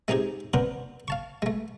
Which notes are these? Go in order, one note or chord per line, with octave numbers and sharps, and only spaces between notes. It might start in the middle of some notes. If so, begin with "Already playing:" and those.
G#3 C4 D#4 G4 G#4
B3 C4 D4 A#4 C5
F5 A5 C#6
G#3 A3